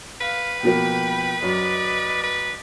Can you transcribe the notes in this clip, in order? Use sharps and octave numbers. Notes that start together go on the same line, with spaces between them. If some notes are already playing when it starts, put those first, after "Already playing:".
B4 F5
B2 F3 A#3 G5 B5
F#2 D5 D#5
B4